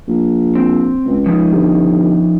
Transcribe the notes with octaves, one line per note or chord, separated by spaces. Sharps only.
A#1
C4
C#2
F3 C#4 D#4
G1